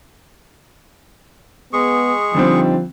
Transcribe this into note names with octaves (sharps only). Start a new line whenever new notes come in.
G#3 B3 G#4 C#6
D3 F3 G3 C4 D#4